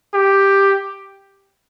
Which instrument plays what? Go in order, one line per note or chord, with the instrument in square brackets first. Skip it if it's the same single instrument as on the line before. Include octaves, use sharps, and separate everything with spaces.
[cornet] G4